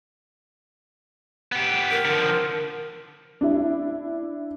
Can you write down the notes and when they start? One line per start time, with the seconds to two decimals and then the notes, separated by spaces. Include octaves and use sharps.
1.52 B3 G4
1.91 A#4
2.05 D3 F3
3.41 D4 E4